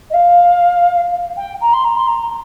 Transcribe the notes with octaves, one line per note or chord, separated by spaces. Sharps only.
D#5
F5
G5
A#5
C6
A#5
C6
A#5